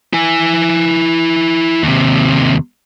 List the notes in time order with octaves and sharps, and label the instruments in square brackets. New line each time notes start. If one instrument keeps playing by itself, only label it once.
[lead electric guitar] E4 G#5
D#2 C3